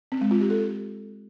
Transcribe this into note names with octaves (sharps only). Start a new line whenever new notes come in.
C4
G#3
F4
G4
A4